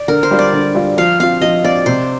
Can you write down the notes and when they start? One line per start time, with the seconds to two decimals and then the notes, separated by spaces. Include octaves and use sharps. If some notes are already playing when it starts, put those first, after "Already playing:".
Already playing: D5
0.08 D3 A#4
0.23 C5
0.31 G3 D4 F4
0.39 D5
0.53 D3
0.75 G3 D4 F4
0.98 F3 F5
1.20 C4 F4 F5
1.41 F3 D#5
1.64 C4 F4 D5
1.86 C3 C5